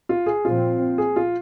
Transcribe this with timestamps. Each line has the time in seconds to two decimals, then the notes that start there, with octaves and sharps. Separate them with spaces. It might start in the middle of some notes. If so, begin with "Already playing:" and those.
0.09 F4
0.26 G#4
0.45 A#2 F3 C4 F4
0.98 G#4
1.16 F4